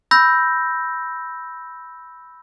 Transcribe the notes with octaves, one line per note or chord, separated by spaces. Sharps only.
B5 E6 G6 A#6